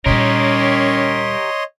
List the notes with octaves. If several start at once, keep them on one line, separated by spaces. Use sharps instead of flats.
A#2 G3 C#4 G4 A#4 C#5 D#5 C6